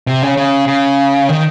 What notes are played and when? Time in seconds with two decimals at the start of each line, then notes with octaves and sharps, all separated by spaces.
0.07 C3
0.22 C#3
0.37 C#3
0.68 C#3
1.29 D#3